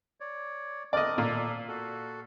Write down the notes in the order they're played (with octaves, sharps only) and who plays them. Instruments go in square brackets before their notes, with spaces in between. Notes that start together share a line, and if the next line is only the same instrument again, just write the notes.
[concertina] C#5 D5
[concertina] C4 D4 A#4 [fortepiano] D5 D#5
[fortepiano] A#2 [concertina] A4 D5
[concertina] F#4 A4